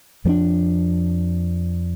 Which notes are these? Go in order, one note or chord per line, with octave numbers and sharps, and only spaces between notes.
F2 F3 A#3 D4